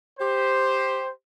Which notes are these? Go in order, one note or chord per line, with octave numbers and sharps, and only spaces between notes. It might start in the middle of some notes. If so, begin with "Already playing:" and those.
G4 C5